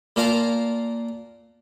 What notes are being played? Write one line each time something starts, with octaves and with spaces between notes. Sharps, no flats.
A#2 A#3 F4 A#4 F5 A5